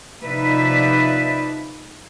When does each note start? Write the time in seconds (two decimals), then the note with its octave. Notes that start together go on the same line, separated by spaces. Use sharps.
0.23 C3 F3 D#4 B4 D5 E5